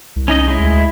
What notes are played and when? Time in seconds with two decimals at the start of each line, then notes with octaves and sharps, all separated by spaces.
0.16 C2
0.28 C#4 D#4 D#5
0.48 G#3 E4
0.60 D2